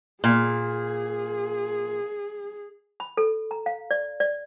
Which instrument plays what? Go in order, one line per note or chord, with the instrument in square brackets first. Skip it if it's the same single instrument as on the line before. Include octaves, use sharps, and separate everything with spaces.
[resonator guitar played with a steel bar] A#2 [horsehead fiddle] G#4
[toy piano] B5
A4
A#5
F5
D5
D5